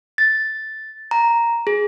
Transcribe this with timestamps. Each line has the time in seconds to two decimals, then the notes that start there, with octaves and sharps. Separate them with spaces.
0.18 A6
1.11 A#5
1.67 G#4